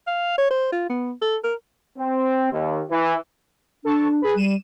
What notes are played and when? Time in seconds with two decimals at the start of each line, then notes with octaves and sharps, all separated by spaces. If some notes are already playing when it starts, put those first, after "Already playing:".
0.07 F5
0.38 C#5
0.50 C5
0.72 F4
0.89 B3
1.22 A4
1.44 A#4
1.98 C4
2.52 D#2
2.90 E3
3.85 D4 A4 A5 C#6
4.22 G#4 B4
4.35 G3 D#7 E7